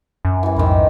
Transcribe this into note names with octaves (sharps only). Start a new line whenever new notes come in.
F#2
E3 G3
B1 F2 G#2 D#3 G4 C5